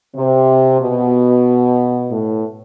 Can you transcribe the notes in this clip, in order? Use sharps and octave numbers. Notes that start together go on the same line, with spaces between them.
C3
B2
A2